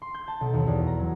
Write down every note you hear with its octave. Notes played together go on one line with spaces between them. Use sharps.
C6
G6
A5
B1
D#2
E2
A#5
F#3